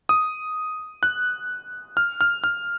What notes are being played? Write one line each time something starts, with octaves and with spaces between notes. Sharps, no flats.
D#6
F#6
F6
F6
F6